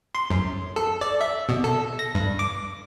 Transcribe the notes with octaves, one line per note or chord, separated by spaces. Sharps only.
C6
F#2
A4
D5
E5
B2
A4
A#6
G2
D6